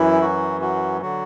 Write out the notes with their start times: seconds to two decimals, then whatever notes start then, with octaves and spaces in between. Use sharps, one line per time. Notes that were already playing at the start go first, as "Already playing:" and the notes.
Already playing: F#2 E3 E4
0.22 F#3 F#4
0.61 F#3 F#4
1.01 D3 F#3 F#4